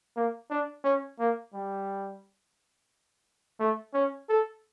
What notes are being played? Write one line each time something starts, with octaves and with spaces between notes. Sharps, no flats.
A#3
D4
C#4
A#3
G3
A3
C#4
A4